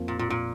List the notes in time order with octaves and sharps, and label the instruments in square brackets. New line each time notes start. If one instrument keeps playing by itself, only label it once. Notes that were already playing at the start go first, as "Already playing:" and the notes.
Already playing: [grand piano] F2 F3 A#3 F4
[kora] A#2
A#2
A#2